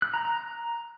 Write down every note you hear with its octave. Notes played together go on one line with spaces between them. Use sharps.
F#6
A#5
A#5